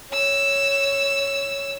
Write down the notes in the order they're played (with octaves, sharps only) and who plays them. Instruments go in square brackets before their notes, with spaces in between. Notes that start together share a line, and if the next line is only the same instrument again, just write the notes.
[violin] C#5 E6